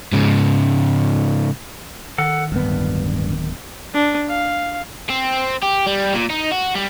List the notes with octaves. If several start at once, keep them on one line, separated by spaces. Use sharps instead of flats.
G#2 C#3
D#3 A4 F#5
D1 G2 B3
D4
F5
C4
G4
G3
A#2
D#4
F#4
G3